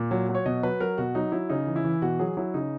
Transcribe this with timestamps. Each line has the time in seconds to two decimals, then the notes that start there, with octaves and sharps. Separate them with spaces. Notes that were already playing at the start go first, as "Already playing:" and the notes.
Already playing: A#2
0.11 F#3
0.29 F#3
0.35 C#5
0.46 B2 D#5
0.63 F#3 B4
0.80 F#3 A#4
0.98 B2 F#4
1.15 F#3 D#4
1.32 F#3 E4
1.50 C#3 D#4
1.67 E3
1.76 E4
1.85 E3
2.02 B2 F#4
2.19 F#3 G#4
2.37 F#3 E4
2.54 C#3 D#4